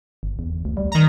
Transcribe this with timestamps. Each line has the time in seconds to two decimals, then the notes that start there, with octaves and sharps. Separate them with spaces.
0.23 G1
0.39 E2
0.65 D2
0.77 G3
0.92 D#3 A#5